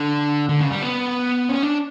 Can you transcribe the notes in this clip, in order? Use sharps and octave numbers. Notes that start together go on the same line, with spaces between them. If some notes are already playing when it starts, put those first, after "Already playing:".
Already playing: D3
D3
C#3
G3
B3
C#4
D4